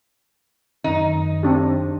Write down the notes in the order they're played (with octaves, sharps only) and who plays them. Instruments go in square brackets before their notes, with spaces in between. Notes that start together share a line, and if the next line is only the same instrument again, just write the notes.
[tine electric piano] F#2 D#3 [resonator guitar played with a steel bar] D#4
[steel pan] C4 D4 G4